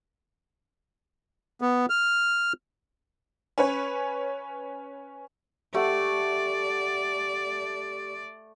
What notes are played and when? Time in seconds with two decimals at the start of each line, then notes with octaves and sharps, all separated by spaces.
1.61 B3
1.90 F6
3.58 C#4 B4 C#5
5.75 A3 G4 D5 F#5 D6